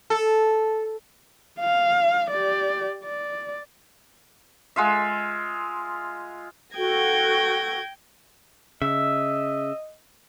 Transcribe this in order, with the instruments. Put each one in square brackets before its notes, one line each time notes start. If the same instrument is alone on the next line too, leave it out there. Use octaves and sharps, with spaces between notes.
[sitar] A4
[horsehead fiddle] F5
G4 D5
D5
[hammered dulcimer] G#3 F4 E5
[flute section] F#4 A4 [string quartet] G5 G#6 A#6
[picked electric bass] C#3 [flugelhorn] D#5 [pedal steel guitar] E5